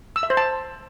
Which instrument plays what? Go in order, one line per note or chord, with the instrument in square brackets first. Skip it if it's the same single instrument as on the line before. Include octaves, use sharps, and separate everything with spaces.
[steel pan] E6
E5
C5
A5